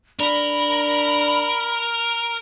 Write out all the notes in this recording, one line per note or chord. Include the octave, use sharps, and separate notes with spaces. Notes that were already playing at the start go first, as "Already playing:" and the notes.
D4 A#4 B5